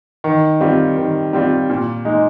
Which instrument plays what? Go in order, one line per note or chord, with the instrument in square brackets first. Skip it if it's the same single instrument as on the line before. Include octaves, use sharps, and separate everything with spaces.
[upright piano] D#3
G3 C4 F4
D#3
G3 C4 F4
A#2
G#3 D#4